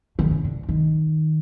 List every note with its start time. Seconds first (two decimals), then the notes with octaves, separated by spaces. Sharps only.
0.19 D3
0.31 C#3
0.44 D3
0.69 D#3